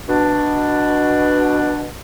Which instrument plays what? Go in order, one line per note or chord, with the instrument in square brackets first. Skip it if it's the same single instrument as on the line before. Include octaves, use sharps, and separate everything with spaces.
[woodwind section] B2 D4